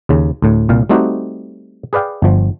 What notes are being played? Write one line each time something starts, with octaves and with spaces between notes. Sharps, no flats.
D#2 C#3
D2 A2
C2 A#2 F5
G3 A3 C4 D#4 F#4 G4
G#4 B4 D5 F5 G5
G1 F3